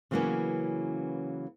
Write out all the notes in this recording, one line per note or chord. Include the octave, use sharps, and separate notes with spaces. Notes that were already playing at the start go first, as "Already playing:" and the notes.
C#3 E3 F#3 A#3 B3 C#4